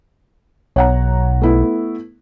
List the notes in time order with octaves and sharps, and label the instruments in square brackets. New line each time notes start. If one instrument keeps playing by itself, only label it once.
[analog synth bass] B1 [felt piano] C#5 F#5 A#5
[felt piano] A3 B3 E4